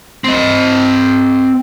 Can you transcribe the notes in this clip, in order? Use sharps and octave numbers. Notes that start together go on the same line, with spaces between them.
C4 D#5